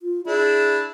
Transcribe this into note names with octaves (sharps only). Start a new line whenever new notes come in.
F4
D4 E4 G#4